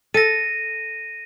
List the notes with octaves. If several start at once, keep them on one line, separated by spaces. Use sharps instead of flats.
A4 A#6 D#7